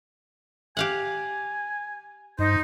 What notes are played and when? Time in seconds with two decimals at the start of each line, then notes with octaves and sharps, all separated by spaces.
0.77 G4 F5 F#5 G#5
2.39 G2 D#4 C5